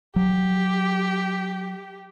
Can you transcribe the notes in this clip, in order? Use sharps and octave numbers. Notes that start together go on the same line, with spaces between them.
F#3 G4